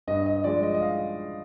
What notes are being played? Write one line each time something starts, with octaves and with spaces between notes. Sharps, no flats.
G2 D#5
D#5
D#5
F3 G#3 D5
D#5
D#5
F5